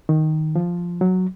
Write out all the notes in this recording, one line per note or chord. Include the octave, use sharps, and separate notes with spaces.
D#3
F3
F#3